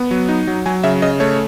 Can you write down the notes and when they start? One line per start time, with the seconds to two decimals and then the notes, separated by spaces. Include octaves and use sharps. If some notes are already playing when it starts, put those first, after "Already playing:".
Already playing: B3
0.11 F#3
0.29 D#4
0.47 F#3
0.66 F#3 G#5
0.83 C#3 E5
1.02 C#3 D#5
1.20 A3 C#5